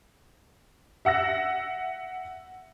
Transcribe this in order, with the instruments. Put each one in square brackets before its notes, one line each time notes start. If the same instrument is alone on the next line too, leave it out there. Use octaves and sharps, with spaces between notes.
[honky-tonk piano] E5 F#5 E6 A#6